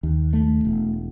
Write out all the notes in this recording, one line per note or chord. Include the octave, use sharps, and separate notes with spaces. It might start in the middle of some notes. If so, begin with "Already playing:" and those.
D#2
A3
E1